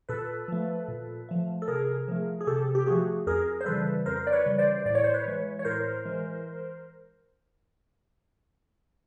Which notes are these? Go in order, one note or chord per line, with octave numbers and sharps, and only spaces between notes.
A#2 A4 B4
F3 A3
A#2
F3 A3
A4
C3 G#4 A#4
F3 A3
G#4
C3 G4 A4
G4
F3 A3 F#4 G#4
F2 G#4 A#4
C5
C#3 E3 G3 A4 B4
F2 A#4 C5
D5
B4 C#5
C#3 E3 G3
C5 D5
A2 D5
C#5
C5
B4 C#5
E3 G#3
C#5
A2 A#4 C5
E3 G#3